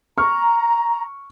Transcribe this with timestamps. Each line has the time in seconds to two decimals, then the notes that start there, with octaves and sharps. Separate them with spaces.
0.18 A#5 C#6 F6